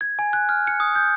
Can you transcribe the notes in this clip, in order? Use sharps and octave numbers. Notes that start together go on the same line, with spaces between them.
G#6
G#5
F#6
F6
C#7
D#6
G6